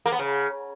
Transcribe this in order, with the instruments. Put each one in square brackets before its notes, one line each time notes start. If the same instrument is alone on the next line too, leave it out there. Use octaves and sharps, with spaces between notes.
[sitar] A#3
B3
C#3